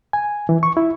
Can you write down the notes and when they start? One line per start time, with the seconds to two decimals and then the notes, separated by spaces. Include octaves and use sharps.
0.13 G#5
0.49 E3
0.63 C#6
0.77 E4